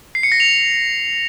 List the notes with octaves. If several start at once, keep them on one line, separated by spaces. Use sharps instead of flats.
C7
C#7
A#6
F7